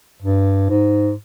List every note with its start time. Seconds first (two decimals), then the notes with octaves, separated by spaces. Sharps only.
0.23 G2
0.70 G#2